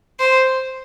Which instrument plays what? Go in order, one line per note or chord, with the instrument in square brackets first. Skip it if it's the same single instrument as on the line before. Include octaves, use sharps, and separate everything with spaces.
[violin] C5